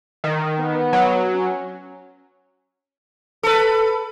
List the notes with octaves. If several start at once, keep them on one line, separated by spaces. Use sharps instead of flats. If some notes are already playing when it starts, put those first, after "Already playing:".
D#3
B3
F#3
C#4
A4 B4